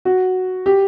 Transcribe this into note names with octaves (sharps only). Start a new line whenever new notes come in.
F#4
G4